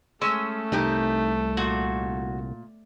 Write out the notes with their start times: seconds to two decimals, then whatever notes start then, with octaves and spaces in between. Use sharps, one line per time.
0.22 G#3 A3 C#4 E6
0.72 C2 D#4 G4 A#4
1.57 A#2 F#4